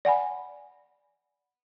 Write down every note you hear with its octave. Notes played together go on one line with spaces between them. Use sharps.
D5 F#5 G#5 B5